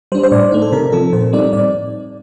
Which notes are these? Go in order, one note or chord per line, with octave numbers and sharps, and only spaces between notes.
G3 D4 C5
C5
A2 D5
A3 D#4
A4
C3 A#4
F3 C4 A4
A#2 C5
G3 C4 D#4 D5
A2 D5